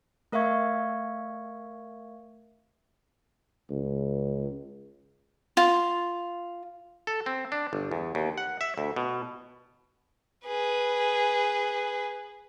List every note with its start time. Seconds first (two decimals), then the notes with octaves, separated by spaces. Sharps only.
0.32 A3 A#4 E5 F5 C#6 G#6
3.70 C#2
5.57 F4
7.07 A4
7.26 C4
7.52 D4
7.73 G1
7.91 E2
8.15 D#2
8.38 F#5
8.61 E5
8.78 D2
8.96 B2
10.46 G#4 B4